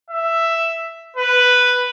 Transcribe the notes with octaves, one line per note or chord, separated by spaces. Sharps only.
E5
B4